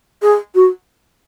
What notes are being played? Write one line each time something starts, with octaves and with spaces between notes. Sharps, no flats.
G#4
F#4